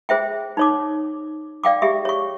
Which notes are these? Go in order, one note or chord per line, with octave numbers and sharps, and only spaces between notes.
G#4 C5 E5 G5
D#4 C#5 D6
D5 F5 G5 D6
G4 G#4 E5
C#5 C#6